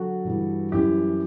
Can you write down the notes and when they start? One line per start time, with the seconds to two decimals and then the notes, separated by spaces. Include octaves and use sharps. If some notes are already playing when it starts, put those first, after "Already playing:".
Already playing: D3 F#3 F#4 A4
0.24 G2 E3 G3
0.72 F#2 E3 G3 E4 G4